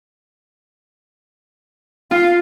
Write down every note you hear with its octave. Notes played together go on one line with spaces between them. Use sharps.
F4 F5